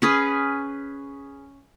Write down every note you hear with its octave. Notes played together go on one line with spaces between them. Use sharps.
C#4 G#4 B4